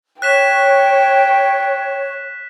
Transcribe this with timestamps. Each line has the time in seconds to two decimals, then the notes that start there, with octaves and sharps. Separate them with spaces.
0.22 C#5 G5 F#6 B6 E7